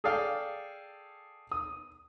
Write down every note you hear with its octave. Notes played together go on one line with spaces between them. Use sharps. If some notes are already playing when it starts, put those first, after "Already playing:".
G#4 A4 D5 F5 G5
D#6